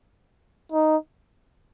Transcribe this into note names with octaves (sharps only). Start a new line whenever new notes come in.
D#4